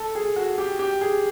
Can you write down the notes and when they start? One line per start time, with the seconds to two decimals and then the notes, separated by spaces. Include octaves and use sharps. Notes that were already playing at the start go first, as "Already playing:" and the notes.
Already playing: A4
0.15 G#4
0.36 F#4
0.58 G4
0.79 G4
1.01 G#4